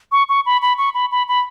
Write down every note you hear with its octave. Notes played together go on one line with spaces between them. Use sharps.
C#6
C#6
B5
B5
C#6
B5
B5
B5